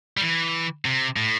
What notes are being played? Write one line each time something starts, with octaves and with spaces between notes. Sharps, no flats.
G3
E3
C3
A2